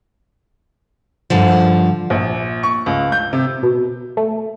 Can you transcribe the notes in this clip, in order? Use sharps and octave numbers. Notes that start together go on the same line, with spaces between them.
G2 D3 F3
A#1
C#6
C#2
G6
C3
B2
A3